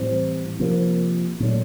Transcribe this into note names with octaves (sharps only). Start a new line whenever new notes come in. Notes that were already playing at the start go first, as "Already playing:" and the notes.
Already playing: A2 E3 G3 C4
C3 F3 A#3
A#2 F#3 A3